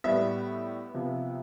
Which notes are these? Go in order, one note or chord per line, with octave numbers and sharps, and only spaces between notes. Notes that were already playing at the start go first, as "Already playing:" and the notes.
A2 G3 B3 E5
C3 F3 B3